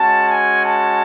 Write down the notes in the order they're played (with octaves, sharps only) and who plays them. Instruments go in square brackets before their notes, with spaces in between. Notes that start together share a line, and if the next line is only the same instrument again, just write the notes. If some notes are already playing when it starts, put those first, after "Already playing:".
Already playing: [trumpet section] G#3 C#4 F#4 A5
G#5
A5